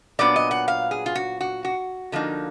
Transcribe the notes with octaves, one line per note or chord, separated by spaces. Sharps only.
A#2 F#3 B3 D4 D5
D#5
F#5
F5
G#4
F4
F#4
F#4
F#4
D3 F3 A#3 D#4